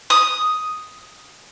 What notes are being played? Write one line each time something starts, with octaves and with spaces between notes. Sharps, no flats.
D#6